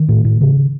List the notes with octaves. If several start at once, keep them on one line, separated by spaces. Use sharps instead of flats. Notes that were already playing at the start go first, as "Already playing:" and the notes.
Already playing: D#3
A2
A2
C#3